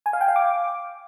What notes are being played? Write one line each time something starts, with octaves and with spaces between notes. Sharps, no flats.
G#5
F5
G5
F5
D6